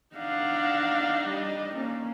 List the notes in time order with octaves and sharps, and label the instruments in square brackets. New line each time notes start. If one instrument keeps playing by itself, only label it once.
[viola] D4 D#4 [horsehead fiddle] F5 F#5
[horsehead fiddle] G3 D#5
A#3 C#4